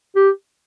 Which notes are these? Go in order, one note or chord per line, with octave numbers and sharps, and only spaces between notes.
G4